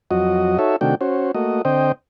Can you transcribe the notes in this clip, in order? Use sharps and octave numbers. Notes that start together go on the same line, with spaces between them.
F2 F#3 F#4 D#5
D#4 F#4 A4 C#5 E5
C3 D#3 A3 D4 F#4 G5
C#4 F#4 C5
A3 A#3 F#4 D#5
D3 C4 C5 D#5 G5